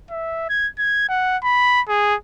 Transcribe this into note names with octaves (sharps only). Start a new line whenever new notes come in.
E5
G#6
G#6
F#5
B5
G#4